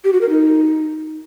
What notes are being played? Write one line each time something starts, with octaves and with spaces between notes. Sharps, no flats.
G4
F#4
A#4
D#4